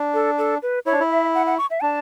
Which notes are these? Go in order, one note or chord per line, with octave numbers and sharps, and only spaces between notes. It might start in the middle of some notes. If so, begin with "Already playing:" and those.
Already playing: D4
A4
A4
B4
E4 C#5
D4
E4
E5
F#5
F#5
C#6
E5
D4 A5